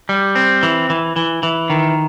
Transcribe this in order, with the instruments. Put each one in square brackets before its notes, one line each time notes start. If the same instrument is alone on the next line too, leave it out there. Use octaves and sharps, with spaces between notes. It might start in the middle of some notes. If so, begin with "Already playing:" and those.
[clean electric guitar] G3
C4
E3
E3
E3
E3
D#3